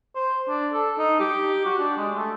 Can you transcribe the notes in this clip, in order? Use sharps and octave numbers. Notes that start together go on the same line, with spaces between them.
C5
D4
A4
D#4
G4
F#4
D4
G#3
A3